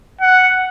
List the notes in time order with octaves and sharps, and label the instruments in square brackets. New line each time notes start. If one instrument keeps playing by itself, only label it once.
[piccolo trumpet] F#5